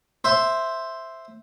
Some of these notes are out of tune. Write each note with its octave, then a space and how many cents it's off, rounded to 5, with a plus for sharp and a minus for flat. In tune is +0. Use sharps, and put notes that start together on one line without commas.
C5 +0 E5 +0 C6 +0